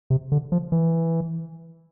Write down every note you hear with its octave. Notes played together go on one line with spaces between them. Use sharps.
C3
D3
F3
E3